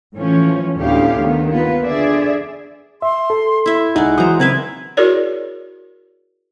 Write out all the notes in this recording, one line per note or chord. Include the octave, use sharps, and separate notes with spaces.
A2 E3 F3 C#4
D2 A2 B3 C#4 G4 F5
D#3 B3
A#3 B3 F4 B4
D3 G#4 D5 E5
E5 C6
A4
E4 E5
C2 G#3 D#4 D5 F#5
E3 F#3 C5 A#5 D#6
C#3 C4 A#4 B4 E5 G#6
E4 F#4 G#4 A#4 C#5 D5